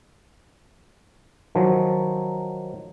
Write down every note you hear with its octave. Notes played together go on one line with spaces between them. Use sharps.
D#3 F3 F#3